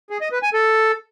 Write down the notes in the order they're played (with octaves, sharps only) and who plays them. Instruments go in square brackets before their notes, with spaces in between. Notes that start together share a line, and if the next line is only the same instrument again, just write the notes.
[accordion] G#4
D#5
B4
G#5
A4